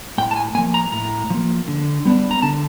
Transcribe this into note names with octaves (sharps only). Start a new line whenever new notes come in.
A2 G5
A5
G#5
F3 A#3 G#5
A#5
A2 A#5
F3 A#3
D3
G3 B3 D4
A#5
D3 A5